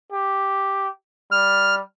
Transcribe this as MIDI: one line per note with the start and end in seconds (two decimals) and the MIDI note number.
0.12 0.89 67
1.32 1.81 55
1.32 1.75 89